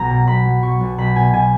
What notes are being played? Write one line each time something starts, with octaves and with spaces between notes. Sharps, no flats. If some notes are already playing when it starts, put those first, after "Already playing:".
Already playing: B1 A#5
B2
B1 B5
F#3
B2 C#6
B1
B1 B5
B2 G#5
B2 G#5